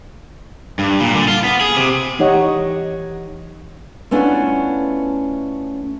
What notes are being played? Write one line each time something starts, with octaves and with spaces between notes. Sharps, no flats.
G2
A#2
D3
F4
B3
G#4
C3
E3 D#4 G4 C#5 D#5 F#5
A3 B3 C#4 D4 E4 F4